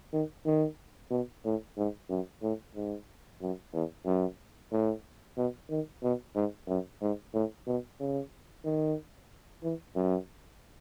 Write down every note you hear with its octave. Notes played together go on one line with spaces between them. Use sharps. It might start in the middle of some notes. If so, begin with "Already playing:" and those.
D#3
D#3
B2
A2
G#2
F#2
A2
G#2
F#2
E2
F#2
A2
B2
D#3
B2
G#2
F#2
G#2
A2
B2
C#3
D#3
E3
F#2